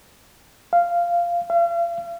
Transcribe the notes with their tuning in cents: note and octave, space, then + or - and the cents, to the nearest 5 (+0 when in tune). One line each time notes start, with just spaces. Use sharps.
F5 -10
F5 -40